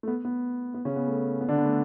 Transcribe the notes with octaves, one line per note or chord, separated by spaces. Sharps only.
A3
B3
B3
B3
C#3 C#4
B3
A3
B3
D3 D4
B3
A3